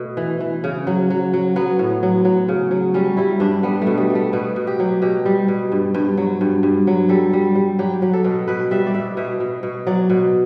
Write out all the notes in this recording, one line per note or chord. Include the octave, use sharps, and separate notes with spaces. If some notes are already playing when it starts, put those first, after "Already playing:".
Already playing: B2 A3
E3
E3
C#3
F#3
F#3
F#3
F#3 B3
A2
F#3
F#3
C#3
F#3
G3 C#4
G3 E4
G2 D4
G3 B3
A3
B2
G3
G3
A3
B2 B3
B2
G4
F#3
B2 G4
G3
B2
G2
G2
F#3
G2
G2
F#3
G3 A4
G3
G3
F#3 G4
F#3
A4
B2
B2 B4
G3 E5
D5
B2 E5
B2 E5
B2
B2
F#3 D5
B2